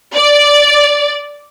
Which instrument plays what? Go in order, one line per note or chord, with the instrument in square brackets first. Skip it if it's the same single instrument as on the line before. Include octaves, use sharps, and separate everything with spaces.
[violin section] D5